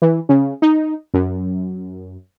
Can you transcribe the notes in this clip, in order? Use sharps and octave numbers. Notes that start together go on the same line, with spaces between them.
E3
C#3
D#4
F#2